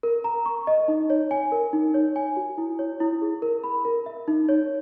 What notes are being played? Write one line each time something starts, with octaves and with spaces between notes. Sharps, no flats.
A#4
A#5
C#6
D#5
D#4
C#5
G#5
A#4
D#4
C#5
G#5
F#4
E4
C#5
E4
G#4
A#4
B5
A#4
E5
D#4
C#5